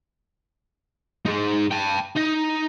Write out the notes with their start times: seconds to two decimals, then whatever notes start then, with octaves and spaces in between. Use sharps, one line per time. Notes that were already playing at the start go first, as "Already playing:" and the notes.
1.26 D#4 G#4
1.71 G5 A5
2.16 D#4 D#5